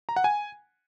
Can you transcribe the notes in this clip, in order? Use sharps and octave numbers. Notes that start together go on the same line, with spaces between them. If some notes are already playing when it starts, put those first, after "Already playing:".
A#5
F#5
G#5